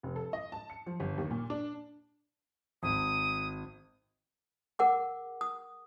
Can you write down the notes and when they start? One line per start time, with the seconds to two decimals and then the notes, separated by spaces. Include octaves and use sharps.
0.03 F1
0.16 A4
0.33 D#5
0.52 A5
0.70 C#7
0.86 F3
1.00 G1
1.18 D#2
1.31 A#2
1.50 D4
2.83 G#1 D#6
4.79 G#4 A#4 F#5 D6
5.41 D#6